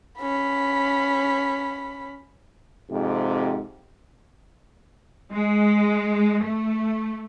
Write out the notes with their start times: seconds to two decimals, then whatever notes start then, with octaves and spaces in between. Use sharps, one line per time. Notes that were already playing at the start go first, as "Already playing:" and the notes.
0.20 C#4 B5
2.90 F2 G#2 C3
5.32 G#3
6.42 A3